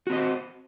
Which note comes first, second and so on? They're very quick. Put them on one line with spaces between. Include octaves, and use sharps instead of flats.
F#4 C4 D#5 C5